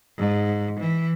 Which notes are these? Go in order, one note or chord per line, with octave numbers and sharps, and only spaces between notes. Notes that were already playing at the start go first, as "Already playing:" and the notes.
G#2
E3